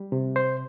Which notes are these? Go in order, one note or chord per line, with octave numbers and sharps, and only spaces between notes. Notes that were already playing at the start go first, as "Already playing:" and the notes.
Already playing: G3
C3
C5